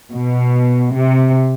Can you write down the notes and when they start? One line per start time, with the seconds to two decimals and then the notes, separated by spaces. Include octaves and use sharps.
0.11 B2
0.95 C3